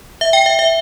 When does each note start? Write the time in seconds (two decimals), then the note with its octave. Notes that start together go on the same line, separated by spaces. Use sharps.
0.21 E5
0.33 G5
0.46 E5
0.59 E5